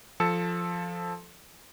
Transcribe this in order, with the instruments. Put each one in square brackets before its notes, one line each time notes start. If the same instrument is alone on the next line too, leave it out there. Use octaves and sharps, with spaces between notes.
[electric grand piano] F3 A4 A5 E6 C#7